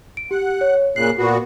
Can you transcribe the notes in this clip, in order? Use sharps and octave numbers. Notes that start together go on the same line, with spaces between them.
D7
G4 F#5
C#5
A#2 C#3 F#6 C7
A#2 B3 F#4